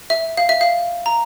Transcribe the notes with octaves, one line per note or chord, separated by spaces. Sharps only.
E5
F5
E5
F5
A#5